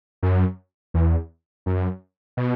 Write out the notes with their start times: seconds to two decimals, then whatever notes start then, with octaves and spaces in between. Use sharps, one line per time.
0.23 F#2
0.94 E2
1.66 F#2
2.37 B2